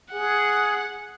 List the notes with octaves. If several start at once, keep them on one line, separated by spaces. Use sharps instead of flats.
G#4 F#5